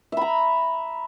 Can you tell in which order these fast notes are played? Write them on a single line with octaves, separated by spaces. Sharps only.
E5 B5 A#5